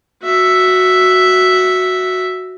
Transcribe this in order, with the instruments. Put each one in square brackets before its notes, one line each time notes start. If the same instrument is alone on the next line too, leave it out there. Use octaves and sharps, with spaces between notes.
[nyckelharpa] F#4 E5